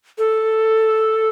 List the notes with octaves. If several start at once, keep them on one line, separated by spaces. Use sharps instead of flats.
A4